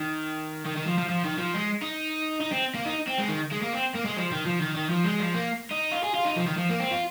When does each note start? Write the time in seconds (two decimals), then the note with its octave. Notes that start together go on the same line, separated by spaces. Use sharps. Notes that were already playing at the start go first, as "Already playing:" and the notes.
Already playing: D#3
0.66 D#3
0.77 D#3
0.87 F3
0.98 F3
1.09 F3
1.24 D#3
1.38 F3
1.54 G#3
1.82 D#4
2.41 D#4
2.52 C4
2.74 A#3
2.85 D#4
3.07 C4
3.18 G#3
3.28 D#3
3.51 G#3
3.62 A#3
3.73 C4
3.95 A#3
4.06 G#3
4.17 F3
4.32 D#3
4.46 F3
4.61 D#3
4.75 D#3
4.90 F3
5.04 G#3
5.19 F3
5.34 A#3
5.71 D#4
5.91 F4
6.03 G#4
6.14 F4
6.25 D#4
6.36 F3
6.47 D#3
6.57 F3
6.69 A#3
6.80 C4
6.91 F4